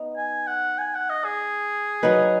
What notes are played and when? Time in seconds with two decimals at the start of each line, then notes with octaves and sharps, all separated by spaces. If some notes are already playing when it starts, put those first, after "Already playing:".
Already playing: B3 D#4
0.17 G#5
0.47 F#5
0.79 G#5
0.95 F#5
1.10 D#5
1.25 G#4
2.03 F#3 D#4 B4